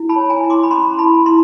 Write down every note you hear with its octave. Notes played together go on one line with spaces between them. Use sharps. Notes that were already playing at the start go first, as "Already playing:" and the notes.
Already playing: E4
A5 B5
C#5
G#5 A#5
E4
C6 D6
B5
C#4 A#5 C6
E4 A5 B5
E4 A#5 C6